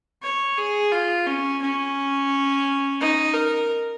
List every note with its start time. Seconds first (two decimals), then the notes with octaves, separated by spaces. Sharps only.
0.22 C#5
0.58 G#4
0.92 F4
1.27 C#4
1.62 C#4
3.01 D#4
3.34 A#4